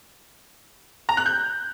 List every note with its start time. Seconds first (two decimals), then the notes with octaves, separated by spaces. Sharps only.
1.09 A#5
1.17 F#6
1.26 G6